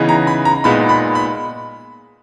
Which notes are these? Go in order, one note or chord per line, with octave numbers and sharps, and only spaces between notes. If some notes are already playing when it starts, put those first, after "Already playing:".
Already playing: C#3 E3 B3 D#4
A#5
B5
A#5
A#2 G#3 B3 D#4 B5
B5
B5